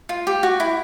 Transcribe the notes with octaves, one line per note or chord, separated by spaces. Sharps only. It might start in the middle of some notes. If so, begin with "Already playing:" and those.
F4
G4
F#4
E4